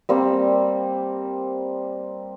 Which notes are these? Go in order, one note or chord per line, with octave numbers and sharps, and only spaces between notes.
G3 A#3 C4